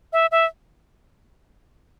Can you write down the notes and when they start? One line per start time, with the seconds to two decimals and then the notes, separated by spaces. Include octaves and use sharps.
0.13 E5
0.31 E5